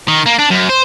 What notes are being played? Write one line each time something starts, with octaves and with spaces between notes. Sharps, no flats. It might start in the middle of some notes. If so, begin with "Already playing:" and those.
D#3
A#3
D4
F#2
C5